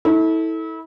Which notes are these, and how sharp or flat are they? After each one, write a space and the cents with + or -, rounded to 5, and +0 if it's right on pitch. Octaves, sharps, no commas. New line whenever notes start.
E4 -35 A4 +0